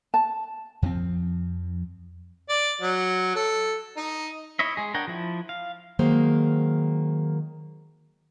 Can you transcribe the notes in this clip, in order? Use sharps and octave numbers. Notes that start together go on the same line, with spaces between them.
A5
F2 F3 G3 C4
D5
F#3
A4
D#4
E4 C#5 D#5 E5
G#3 G#4
D4 A#4 C#5 F#5 G5
F3 E4
F5
D#3 F#3 G#3 A#3 C5